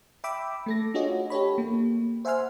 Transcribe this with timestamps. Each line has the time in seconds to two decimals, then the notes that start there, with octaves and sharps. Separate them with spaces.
0.24 E5 G5 B5 D6 E6
0.66 A3 A4 A#6
0.94 D4 F4 F#4 G#4 C#5 D#5
1.30 G4 A4 C#5 B5
1.58 A#3
2.25 C5 E5 F#5 G#5 C6 F6